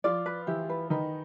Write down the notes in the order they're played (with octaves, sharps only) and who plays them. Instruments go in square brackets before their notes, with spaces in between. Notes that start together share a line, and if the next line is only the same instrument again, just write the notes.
[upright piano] F3 F4 [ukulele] D5
[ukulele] B4
[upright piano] E3 E4 [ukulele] G4
[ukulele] B4
[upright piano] D#3 D#4 [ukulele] B4